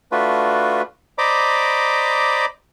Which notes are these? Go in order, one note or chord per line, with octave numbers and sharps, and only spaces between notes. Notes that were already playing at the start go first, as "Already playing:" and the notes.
A3 D4 F4 F#4 B4
C5 D5 D#5 A#5 B5 D6